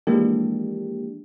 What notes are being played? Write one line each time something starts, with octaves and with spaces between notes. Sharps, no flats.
E3 F3 G#3 A#3 D4 G4